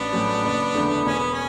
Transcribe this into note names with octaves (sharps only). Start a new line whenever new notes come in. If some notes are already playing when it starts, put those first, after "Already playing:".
Already playing: A1 B3 D4
A2 F#3 A3 C#4
F#1
E2 D3 A3
E1 C#4
B3
C#4